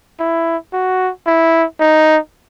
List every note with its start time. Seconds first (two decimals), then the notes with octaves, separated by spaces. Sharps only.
0.19 E4
0.73 F#4
1.27 E4
1.80 D#4